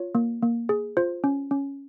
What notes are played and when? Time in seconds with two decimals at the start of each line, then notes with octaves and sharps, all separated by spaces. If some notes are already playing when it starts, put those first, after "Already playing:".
Already playing: F4 C#5
0.15 A#3
0.43 A#3
0.69 G#4
0.97 F4 C5
1.24 C#4
1.51 C#4